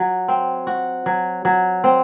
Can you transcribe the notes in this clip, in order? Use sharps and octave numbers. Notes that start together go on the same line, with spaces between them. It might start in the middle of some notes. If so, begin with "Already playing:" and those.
Already playing: F#3
C4
F#4
F#3
F#3
C4